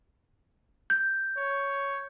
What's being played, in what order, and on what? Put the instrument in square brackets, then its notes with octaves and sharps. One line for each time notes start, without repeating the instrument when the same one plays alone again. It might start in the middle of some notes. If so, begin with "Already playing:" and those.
[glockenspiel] G6
[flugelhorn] C#5